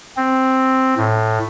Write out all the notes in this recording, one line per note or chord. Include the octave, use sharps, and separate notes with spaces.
C4
A2